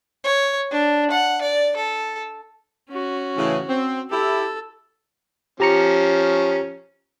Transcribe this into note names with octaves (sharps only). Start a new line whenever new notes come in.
C#5
D4
F#5
D5
A4
C#4 F#4
A2 C#3 E3
C4
E4 G4 A4
F3 C#4 G4 A#5 C#7